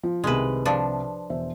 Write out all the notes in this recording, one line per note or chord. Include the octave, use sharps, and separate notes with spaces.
F3
C2 C3 D#3 G#3 B4
F3 D4
E1 C5 E5